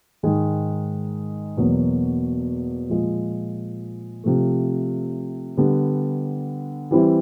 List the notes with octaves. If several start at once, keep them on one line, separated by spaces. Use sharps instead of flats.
G#2 D#3 G#3
E2 B2 F#3 A#3
A#2 F3 G#3
C3 F3 A3
D3 G3 B3
E3 G3 C4 E4